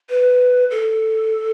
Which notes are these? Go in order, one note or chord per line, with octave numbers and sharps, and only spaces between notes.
B4
A4